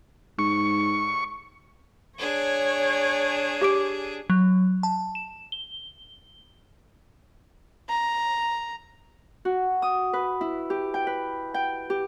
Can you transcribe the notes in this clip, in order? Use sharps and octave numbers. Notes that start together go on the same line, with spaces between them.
G#2 C#6
D4 G#4 C#5
G4 D6 D7
F#3
A5
E7
G7
A#5
F#4
D#6
B4
E4
G4
G5
B4
G5
G4